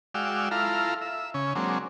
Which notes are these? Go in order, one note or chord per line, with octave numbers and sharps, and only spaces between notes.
G#3 F#4 D5 F5 G5 E6
E4 F4 A4 F5 A#5
E5
C#3 C#4
F#3 G#3 A#3 C4 D4